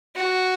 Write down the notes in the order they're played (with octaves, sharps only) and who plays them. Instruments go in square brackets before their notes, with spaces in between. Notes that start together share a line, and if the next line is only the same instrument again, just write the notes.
[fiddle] F#4